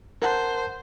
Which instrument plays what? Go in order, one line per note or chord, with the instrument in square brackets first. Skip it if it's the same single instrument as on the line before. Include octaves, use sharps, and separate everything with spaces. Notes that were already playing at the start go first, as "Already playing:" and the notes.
[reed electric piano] A#4 F#5 A5 [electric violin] C5